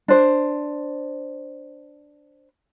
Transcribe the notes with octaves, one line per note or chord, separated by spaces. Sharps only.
D4 C5